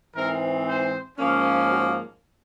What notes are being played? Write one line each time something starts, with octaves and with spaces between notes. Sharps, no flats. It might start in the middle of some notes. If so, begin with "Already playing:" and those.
G#2 E3 G#3 C4 A#4
C5
G#2 F3 A#3 C#4
F#4